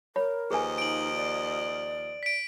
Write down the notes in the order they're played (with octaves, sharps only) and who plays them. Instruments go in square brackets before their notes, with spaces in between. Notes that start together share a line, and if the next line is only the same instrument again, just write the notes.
[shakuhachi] A#4 [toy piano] C#5 B5
[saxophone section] D#2 F3 D#5 [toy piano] G#4 B4 G#5
[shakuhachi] D#4 [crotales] D7 F#7
[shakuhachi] D5
[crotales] B6 D7